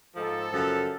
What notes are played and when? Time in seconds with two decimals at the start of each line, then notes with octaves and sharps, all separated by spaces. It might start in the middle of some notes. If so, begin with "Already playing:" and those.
0.15 G#2 F3 A4
0.52 F#2 C#3 F3